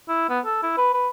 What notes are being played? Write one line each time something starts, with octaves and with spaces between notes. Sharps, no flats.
E4
B3
A4
E4
B4
B4